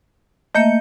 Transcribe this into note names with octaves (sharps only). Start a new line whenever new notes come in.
A3 A#3 D#5 E5 G6 C#7